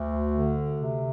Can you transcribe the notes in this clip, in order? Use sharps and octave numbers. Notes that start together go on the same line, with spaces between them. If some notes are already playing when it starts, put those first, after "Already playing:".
Already playing: D2
D3
C3